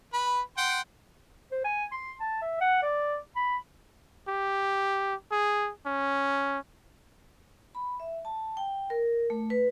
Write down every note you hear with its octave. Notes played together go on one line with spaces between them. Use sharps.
B4 B5
F#5 G5 C6
C5
G#5
C6
A5
E5
F#5
D5
B5
G4
G#4
C#4
B5
E5
A5
G5
A#4
A3
B4